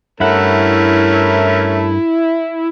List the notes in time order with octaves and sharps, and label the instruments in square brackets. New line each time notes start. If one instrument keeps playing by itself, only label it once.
[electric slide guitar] G2 F#5 [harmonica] A3 C#4 A#4 [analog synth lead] E4